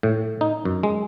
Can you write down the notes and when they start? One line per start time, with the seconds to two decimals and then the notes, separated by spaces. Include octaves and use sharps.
0.03 A2
0.41 D#4
0.65 F#2
0.83 G#3